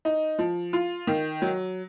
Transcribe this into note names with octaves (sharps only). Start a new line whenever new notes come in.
D#4
F3
F4
D#3
F#3